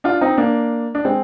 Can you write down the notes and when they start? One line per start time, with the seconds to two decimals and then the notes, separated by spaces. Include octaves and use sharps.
0.04 D4 F4
0.21 C4 D#4
0.37 A#3 D4
0.95 D4
1.05 G#3 C4